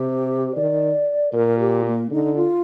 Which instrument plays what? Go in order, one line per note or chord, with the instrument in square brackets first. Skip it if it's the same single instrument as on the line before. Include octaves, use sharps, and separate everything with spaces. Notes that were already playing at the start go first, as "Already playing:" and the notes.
Already playing: [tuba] C3 [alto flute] G4
[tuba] D#3 [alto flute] D5
[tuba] A#2 [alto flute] A#4
[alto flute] G4
A#3
[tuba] D3 [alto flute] D#4
[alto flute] F4